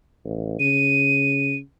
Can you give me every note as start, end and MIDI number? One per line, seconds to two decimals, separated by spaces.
0.24 0.57 33
0.60 1.59 49
0.60 1.55 99